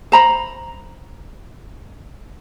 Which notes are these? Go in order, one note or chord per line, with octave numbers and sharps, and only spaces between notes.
C5 A#5 B5